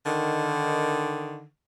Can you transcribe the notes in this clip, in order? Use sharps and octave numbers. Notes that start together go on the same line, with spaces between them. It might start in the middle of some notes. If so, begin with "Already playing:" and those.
D3 D#3